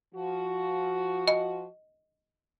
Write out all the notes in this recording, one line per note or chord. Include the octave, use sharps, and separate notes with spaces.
F3 F#4
D#5